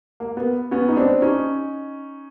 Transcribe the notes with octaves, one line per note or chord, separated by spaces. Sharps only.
A#3
B3
B3 C#4
D#4
C4 D4
C#4 D#4